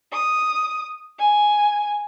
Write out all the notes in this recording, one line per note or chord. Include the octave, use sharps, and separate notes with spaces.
D#6
G#5